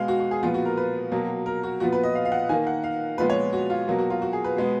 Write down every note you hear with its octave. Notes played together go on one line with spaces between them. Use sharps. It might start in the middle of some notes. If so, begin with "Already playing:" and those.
Already playing: B2 G#3 B3 F5
F#4
F#4
G#4
A#2 F3 B3 F4
F#4
A#4
B4
B2 F#3 A#3
A#4
F#4
A#2 F3 B3 F#4
B4
D#5
F5
F5
F#5
D#3 A#3 G#5
F#5
F5
A#2 F3 G#3 B3 B4
C#5
F#4
F4
B2 F#3 A#3 F4
F#4
F4
F#4
G#4
B4
B2 G#3 B3